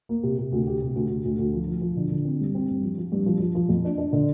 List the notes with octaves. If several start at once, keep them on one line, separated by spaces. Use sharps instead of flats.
A#3
C3
C3
D2
G4
C3
D2
D2
D2
D2
F3
F3
F3
D3
D3
C4
G2
C4
G2
F3
F3
G2
F3
F3
F3
F2
D4
D4
D3